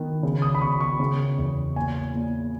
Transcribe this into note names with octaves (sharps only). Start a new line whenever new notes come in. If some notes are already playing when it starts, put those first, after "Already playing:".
Already playing: D#3 B3
C#3
D#6
B5
B3 C#6
C#6
C#3
E2
A#2 G#5
A#2